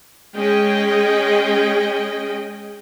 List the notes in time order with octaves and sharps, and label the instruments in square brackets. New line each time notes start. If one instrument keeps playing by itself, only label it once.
[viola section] G#3 C#4 G#4 D#5 G5